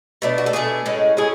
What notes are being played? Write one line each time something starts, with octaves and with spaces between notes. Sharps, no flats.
B2 A3 D4
F#4
A4
B2 A3 D4 G#4
A2 G#3 C#4
A2 G#3 C#4 G#4